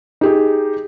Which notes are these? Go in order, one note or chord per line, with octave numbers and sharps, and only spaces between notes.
D#4 G4 G#4